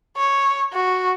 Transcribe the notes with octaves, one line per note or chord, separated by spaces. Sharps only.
C#5
F#4